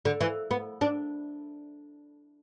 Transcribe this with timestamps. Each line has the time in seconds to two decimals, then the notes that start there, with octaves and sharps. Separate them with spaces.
0.05 D3
0.21 E3
0.51 B3
0.81 D4